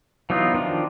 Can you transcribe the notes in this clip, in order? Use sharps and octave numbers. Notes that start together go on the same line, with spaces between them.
E3 F#3 B3 D#4 F4
D#3 F3 D4 F4 D6